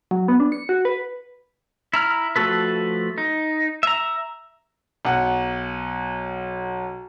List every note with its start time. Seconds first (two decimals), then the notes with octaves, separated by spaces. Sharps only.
0.11 F#3
0.28 B3
0.40 D4
0.52 C#7
0.69 F#4
0.85 B4
1.93 E4 A#5 F6
2.36 F3 A3 F#4 A4 B4
3.18 D#4
3.83 E5 A#5
5.05 B1 F#5